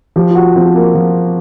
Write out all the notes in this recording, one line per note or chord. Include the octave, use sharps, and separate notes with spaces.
F3 G4
F4
F#4
F3 C4
A#3
F3